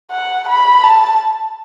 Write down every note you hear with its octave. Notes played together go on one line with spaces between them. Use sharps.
F#5
B5
A5